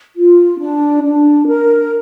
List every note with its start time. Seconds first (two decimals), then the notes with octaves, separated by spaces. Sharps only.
0.16 F4
0.59 D4
1.02 D4
1.47 A#4